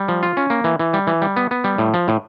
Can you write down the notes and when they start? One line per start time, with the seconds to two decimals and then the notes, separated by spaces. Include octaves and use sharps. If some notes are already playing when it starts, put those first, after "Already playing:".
Already playing: G3
0.08 F3
0.23 F4
0.37 C#4
0.50 A#3
0.64 E3
0.79 E3
0.93 G3
1.07 E3
1.22 G3
1.36 B3
1.51 B3
1.64 G3
1.78 A2
1.94 F3
2.08 A2